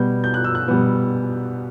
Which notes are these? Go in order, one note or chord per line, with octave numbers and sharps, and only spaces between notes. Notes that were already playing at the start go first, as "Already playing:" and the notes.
Already playing: B2 G3 B3 G6
G6
F#6
E6
F#6
B2 G3 B3